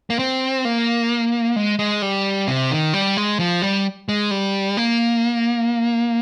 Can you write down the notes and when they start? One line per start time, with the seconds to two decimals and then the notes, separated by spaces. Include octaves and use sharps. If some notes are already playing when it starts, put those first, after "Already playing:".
0.10 A#3
0.19 C4
0.65 A#3
1.56 G#3
1.79 G#3
2.02 G3
2.48 C3
2.71 D#3
2.93 G3
3.17 G#3
3.40 F3
3.62 G3
4.09 G#3
4.31 G3
4.77 A#3